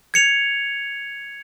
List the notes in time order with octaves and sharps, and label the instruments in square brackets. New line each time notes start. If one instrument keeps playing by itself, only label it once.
[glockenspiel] G#6 C#7 F7